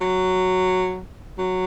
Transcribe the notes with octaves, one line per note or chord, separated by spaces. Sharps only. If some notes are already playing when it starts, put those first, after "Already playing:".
F#3
F#3